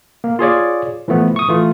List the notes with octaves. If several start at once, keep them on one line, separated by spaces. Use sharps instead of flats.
A#3
F4 G#4 C#5 D5
E3 F3 A3 B3
C#6 D#6
E3 A3 F4